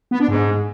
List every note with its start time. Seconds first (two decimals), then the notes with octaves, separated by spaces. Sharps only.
0.11 B3
0.20 D4
0.28 G#2